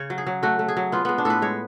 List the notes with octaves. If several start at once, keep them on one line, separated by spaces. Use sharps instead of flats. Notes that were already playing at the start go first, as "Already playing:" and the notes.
Already playing: C#3 C#5
F#3
G#4
F#3
A3 F#4
A3
G#4
F#3
B3 F4
G#3 B3
D4
A2 A4 B4
G#3 C#5